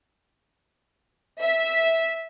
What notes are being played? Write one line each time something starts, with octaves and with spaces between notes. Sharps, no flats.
E5